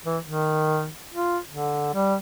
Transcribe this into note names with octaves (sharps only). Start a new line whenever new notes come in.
E3
D#3
F4
D3
G3